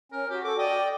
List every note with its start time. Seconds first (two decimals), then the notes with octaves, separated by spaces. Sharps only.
0.12 C#4 A#4
0.30 F#4 G4
0.44 A4 D6
0.59 D5 D#5 G5